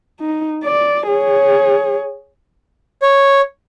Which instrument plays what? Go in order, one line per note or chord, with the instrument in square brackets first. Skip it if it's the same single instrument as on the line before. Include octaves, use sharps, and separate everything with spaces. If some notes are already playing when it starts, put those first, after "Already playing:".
[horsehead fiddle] D#4
D5
G#4 C#5
[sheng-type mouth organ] C#5